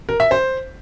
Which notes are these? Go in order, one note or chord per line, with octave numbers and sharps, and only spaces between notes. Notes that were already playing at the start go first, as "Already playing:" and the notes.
A#4
E5
C5